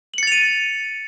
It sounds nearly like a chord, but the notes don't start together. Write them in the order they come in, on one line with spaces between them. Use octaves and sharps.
F#7 C#7 A6 F7 D#7